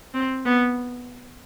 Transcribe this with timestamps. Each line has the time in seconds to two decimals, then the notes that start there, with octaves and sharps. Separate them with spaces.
0.14 C4
0.45 B3